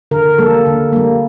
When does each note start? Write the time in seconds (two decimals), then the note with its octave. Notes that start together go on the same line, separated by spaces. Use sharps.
0.11 D3 A#4
0.39 G3 A#3 A4
0.66 D3
0.93 G3 A#3